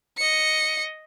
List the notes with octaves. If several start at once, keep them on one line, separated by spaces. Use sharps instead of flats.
D#5 C#7